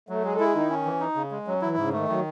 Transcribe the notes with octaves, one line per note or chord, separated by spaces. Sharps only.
F#3 A3
G#3 G#4
A4
E4 G#4
D#3 D#4
C#4
E3
D#4
C#3
G#3
F#3 C#4
E3 E4
G#2 C#3
E3
D#3 A3
D#3 F#3